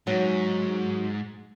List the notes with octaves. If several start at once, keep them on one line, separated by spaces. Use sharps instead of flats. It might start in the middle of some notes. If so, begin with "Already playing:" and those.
G#2 F#3